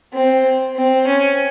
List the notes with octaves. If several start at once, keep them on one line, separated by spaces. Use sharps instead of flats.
C4
C4
C#4